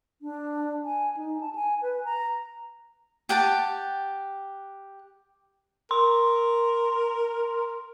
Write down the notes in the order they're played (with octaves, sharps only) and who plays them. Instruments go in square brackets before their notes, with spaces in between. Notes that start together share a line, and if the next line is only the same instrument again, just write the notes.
[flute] D4
G#5
D#4
A5
G#5
B4
A#5
[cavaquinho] G4 F#5 G5 A5
[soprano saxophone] A#4 [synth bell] C6